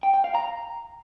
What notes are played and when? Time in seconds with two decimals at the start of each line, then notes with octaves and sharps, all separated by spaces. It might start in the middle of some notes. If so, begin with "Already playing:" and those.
0.03 G5
0.14 G5
0.24 F5
0.35 A#5